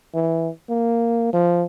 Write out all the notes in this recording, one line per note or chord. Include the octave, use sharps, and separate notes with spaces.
E3
A#3
F3